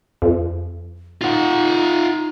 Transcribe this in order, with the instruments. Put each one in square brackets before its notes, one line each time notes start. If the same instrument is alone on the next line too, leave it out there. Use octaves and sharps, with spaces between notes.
[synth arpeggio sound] F2
[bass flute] D#4 [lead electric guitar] F4 F#5